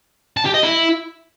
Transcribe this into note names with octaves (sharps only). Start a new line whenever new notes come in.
A5
G4
D#5
E4